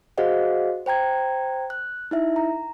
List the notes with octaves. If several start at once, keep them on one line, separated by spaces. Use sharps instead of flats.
F#4 G#4 C5 D#5 F5 F#5
C5 G5 A#5 G#6
F#6
D#4 E4 E5
A#5